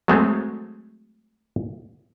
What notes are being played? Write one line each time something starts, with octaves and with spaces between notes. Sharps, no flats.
F#3 G#3 A3 C4